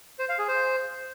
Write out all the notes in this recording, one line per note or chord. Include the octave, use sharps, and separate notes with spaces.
C5
F5
G#4
C5